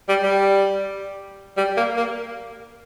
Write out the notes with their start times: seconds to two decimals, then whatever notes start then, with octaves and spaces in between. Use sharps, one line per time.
0.09 G3
0.23 G3
1.57 G3
1.77 A#3
1.96 A#3